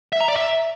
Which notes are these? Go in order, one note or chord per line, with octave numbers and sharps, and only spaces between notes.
E5
A#5
D5
E5